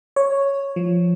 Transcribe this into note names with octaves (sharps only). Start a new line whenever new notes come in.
C#5
F3